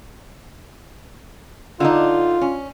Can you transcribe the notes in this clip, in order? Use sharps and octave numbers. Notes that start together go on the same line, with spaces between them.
D3 D4 D#4 F4
C#4